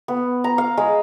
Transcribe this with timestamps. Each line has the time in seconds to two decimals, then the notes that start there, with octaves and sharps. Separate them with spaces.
0.08 B3
0.44 A#5
0.58 F5
0.77 G#3